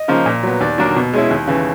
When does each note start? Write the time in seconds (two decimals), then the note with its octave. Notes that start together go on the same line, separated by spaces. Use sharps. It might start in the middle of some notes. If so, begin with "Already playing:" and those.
Already playing: D#5
0.08 C#3 F3 A#3 D#4
0.26 A#2
0.43 F#3 B3
0.60 D#2 D5
0.78 D3 F#3 A#3 D4
0.96 B2
1.13 G#3 C#4 E4
1.31 D#2
1.47 C#3 E3